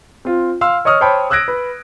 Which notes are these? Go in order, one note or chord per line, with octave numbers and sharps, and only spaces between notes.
C4 F4
F5 C6 E6 F6
C#5 D#5 C#6 D#6 F6
C5 C#5 G5 A5 B5
D#6 E6 F#6 G#6 A#6 D7
B4